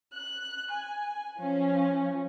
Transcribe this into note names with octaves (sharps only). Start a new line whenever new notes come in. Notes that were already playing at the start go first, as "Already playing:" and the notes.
F#6
G#5
F3 C#4